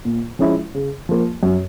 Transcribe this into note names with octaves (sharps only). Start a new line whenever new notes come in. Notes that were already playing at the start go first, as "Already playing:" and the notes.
A#2
F3 G#3 C#4 E4
C#3
F3 A#3
F#2